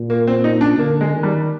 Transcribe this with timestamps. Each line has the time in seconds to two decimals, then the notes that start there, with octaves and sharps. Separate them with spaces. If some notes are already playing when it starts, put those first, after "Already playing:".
Already playing: A#2
0.10 A#3
0.27 C4
0.44 D#4
0.61 D4
0.78 D3 A#3
1.01 G#3
1.13 D#3
1.23 G3